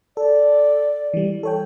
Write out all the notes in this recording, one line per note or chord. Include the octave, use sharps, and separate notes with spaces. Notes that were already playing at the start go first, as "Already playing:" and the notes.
A4 D5
E3 G3
A4 C#5 G5